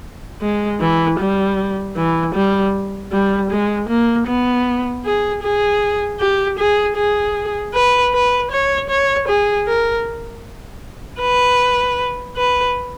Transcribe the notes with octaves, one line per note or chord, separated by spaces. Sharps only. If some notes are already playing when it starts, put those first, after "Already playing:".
G#3
E3
G3
E3
G3
G3
G#3
A#3
B3
G#4
G#4
G4
G#4
G#4
B4
B4
C#5
C#5
G#4
A#4
B4
B4